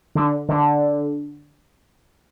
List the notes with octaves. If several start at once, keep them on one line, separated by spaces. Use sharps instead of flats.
D3
D3